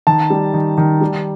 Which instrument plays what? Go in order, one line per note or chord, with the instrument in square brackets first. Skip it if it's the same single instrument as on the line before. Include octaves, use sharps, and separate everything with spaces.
[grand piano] D#3 A5
G3
D#3
D#3
G3